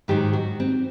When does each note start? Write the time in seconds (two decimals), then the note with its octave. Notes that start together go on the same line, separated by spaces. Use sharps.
0.08 G#2 D#3 F#3 G4
0.33 F#4
0.60 C4